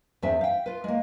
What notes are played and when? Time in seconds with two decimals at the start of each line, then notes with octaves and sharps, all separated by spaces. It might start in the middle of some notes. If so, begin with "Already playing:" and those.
0.22 E2 G2 C4 D4 G#4 E5
0.41 F5 G5
0.66 F4 B4
0.84 G#3 A#3